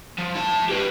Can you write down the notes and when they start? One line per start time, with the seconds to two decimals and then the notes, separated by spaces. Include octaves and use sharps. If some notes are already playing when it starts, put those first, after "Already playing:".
0.18 F3
0.35 E4 A5
0.69 G4 B4